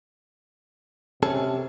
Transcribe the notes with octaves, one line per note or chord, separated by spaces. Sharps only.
C3 C#4 G#4 A4